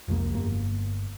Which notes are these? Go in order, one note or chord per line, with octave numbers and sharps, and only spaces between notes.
F1 C2 F2 A#3
G1 A#3